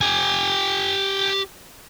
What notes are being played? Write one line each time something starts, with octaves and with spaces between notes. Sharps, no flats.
G4 G#5